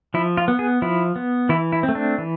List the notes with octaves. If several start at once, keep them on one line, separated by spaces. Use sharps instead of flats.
F3 E4
F4
B3
G#4
F3 E4
B3
E3 E4
E4
C4
A3
D4
E3